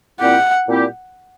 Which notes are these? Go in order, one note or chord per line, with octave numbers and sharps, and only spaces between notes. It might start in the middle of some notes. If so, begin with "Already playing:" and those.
A#2 G3 C4 E4 G4 F#5
A#2 G3 C4 E4 G4